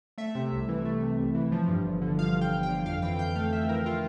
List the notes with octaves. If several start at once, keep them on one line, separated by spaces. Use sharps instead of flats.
A3 E5
C3
C2
E3
A3
C3
C2
E3
F3
G2
G1
D3
F3 F5
G2
G5
G1
G5
D3
F2 F5
E3 G5
F2 G5
A3 F5
F2 E5
E3 A#4
F4